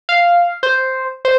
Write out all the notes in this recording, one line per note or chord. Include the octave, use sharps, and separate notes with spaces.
F5
C5
C5